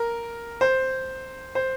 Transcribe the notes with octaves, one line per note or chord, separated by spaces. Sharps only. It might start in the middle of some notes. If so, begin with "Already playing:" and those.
Already playing: A#4
C5
C5